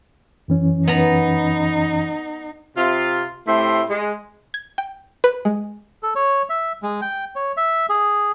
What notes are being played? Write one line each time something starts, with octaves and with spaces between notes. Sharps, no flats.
F#2 E3 C#4
B3 D#4 A#5
C3 F4
A2 A3 C4 E4 G4 C6
G#3
G#6
G5
B4
G#3
A4
C#5
E5
G#3
G5
C#5
E5
G#4